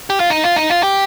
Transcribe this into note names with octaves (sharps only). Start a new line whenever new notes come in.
G4
F4
D#4
F4
D#4
F4
G4